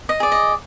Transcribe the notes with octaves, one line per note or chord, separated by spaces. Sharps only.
D#5
G#4 D5
D#5